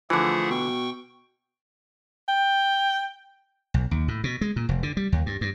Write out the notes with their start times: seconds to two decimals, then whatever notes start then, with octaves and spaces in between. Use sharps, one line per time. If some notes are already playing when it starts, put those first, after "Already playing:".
0.10 D3 E3 F3 A3 G#4 F#5
0.50 B2 G5 C#6
2.28 G5
3.74 B1
3.91 D#2
4.08 A2
4.24 B2
4.41 G#3
4.56 A#2
4.69 F1
4.83 D3
4.97 G3
5.12 D#2
5.26 G2
5.41 G2